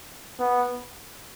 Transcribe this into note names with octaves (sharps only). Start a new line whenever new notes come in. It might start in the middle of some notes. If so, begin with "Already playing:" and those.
B3